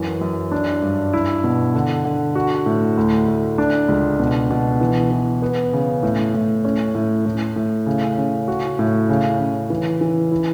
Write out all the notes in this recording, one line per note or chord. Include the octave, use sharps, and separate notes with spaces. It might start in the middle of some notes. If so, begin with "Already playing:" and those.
Already playing: F#2 E3
F#2
D4
G2
E4
B2
D3
D3
F#4
A2
D2
D2
D4
C#2
B2
B2
E3
E3
B3
C#3
A2
A2
C#4
A2
A2
A2
C#3
C#3
F#4
A2
C#3
C#3
E3
E3
E4